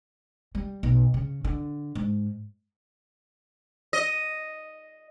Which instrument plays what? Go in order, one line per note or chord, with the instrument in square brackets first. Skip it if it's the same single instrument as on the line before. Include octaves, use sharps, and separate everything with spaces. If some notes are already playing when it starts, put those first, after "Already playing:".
[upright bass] G3
B1
C#3
D3
G#2
[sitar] D#5